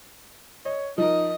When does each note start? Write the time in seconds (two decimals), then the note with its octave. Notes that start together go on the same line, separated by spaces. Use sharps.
0.65 C#5 D#5
0.98 F3 D#4 A#4 D#5